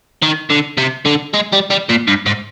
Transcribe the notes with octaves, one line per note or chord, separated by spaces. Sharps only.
D#3
D3
C3
D3
G#3
G3
G3
A#2
G2
G#2